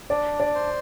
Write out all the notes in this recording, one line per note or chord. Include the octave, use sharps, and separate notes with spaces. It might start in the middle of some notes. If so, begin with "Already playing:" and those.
D4 D5
D5
C5